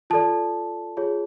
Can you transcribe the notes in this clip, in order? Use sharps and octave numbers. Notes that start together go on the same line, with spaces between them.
F4 A4 D5 A5
F4 G#4 C#5